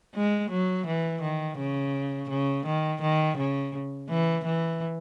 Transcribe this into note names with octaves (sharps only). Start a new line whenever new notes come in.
G#3
F#3
E3
D#3
C#3
C#3
D#3
D#3
C#3
E3
E3